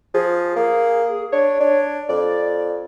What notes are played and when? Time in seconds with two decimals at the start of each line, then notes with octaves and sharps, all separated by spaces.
0.14 F3 G#4
0.56 A#3
1.32 D4 C#5
1.60 D4
2.09 F2 D5